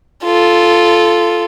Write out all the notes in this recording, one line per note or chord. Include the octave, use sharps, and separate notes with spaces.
F4 A4